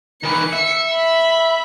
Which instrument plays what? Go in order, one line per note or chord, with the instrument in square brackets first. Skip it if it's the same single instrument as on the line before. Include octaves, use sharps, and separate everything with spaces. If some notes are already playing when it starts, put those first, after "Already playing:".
[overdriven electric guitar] D#3 E3 [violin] C#7
[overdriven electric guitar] E5
[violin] B5